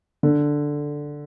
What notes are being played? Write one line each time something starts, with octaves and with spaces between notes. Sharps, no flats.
D3